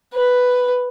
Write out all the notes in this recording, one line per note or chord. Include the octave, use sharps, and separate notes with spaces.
B4